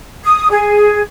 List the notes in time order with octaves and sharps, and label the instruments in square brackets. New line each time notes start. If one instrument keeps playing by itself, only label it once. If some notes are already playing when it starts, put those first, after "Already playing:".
[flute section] D#6
G#4